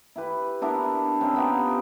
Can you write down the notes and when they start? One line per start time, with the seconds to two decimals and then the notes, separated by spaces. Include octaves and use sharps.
0.16 E4 G4 B4
0.61 B3 D4 E4 A#4
1.21 C4 C#4 D#4 G#4
1.36 B3 D#4 F4 G4